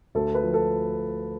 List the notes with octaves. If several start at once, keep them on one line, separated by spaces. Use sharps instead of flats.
D2 A4
B4
F3
A4